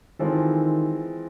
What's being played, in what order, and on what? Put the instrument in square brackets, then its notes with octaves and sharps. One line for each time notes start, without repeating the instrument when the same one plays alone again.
[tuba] D#3 [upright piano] E3 G#3 C4 F4 A4